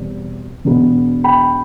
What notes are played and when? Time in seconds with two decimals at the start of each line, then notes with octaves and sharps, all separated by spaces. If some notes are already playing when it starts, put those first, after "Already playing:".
Already playing: E2 B2 G3 C4
0.65 E1 E2 B2 B3
1.24 G5 B5